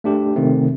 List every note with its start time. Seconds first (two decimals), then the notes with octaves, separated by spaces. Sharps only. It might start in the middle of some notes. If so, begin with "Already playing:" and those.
0.04 A3 D4 G4
0.36 C3 D#3 A3 C4 D#4